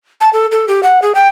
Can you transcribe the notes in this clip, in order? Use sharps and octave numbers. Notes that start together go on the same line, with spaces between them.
A5
A4
A4
G4
F#5
G#4
G5